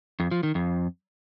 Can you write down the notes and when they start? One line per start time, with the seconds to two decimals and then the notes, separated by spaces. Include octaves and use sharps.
0.20 F2
0.31 F3
0.43 D#3
0.55 F2